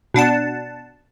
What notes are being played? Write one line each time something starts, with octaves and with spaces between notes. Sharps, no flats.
B2 D4 F#5 A5